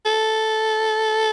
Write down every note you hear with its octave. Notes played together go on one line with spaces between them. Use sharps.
A4